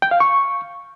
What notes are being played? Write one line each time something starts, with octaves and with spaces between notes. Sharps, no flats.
G5
F5
C#6